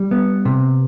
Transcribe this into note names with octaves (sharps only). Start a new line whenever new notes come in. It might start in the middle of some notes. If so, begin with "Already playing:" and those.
Already playing: G3
B3
C3